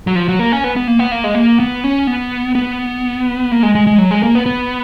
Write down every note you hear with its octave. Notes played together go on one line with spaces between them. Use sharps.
F#3
F3
F#3
A#3
C#4
B3
B3
A#3
B3
A#3
G#3
A#3
B3
C#4
B3
B3
A#3
G#3
G#3
G#3
F#3
G#3
A#3
B3
B3